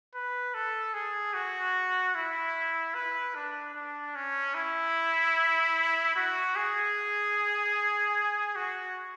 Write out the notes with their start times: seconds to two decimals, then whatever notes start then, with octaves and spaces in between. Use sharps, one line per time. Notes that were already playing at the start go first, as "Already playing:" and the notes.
0.15 B4
0.54 A4
0.94 G#4
1.34 F#4
2.15 E4
2.95 B4
3.35 D4
3.74 D4
4.15 C#4
4.54 E4
6.16 F#4
6.56 G#4
8.56 F#4